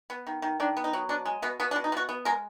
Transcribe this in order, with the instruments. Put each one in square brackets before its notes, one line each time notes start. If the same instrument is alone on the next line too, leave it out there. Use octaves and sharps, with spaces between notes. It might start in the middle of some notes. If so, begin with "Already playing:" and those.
[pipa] B3
D#3
D#3
D#3 D4
B3
D#4
F#3
B2 D4
G#3
B2 B3
B2 B3
D4
B2
D#4
B2 F#4
B3
G#3 A#4